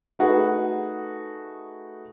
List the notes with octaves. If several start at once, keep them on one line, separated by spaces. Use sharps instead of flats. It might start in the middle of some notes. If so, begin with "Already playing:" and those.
A3 D#4 F#4 G#4 B4